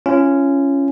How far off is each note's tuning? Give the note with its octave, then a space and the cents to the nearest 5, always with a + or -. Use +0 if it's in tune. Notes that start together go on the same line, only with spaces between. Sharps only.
C#4 +0 F4 -40